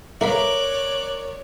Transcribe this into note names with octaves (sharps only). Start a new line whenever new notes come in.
E4 A#4 C#5 D5 F5 B5 D6 F#6